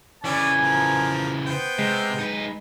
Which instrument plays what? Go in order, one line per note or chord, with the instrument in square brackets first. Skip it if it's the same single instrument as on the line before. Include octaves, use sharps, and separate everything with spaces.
[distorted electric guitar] C#3 E3 [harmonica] C#4 D5 [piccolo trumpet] G#5
[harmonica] F3 A#4
[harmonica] B3 G5 [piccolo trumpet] C5
[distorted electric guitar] C3 [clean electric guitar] G#3
[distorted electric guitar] D#4 B4